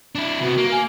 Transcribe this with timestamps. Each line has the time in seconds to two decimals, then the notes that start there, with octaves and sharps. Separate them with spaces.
0.15 D4 E4
0.41 C3 B3 F#4
0.57 A#3
0.71 G#5